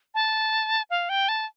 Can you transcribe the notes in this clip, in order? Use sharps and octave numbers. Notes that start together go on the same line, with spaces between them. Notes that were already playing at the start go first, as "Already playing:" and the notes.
A5
F5
G5
A5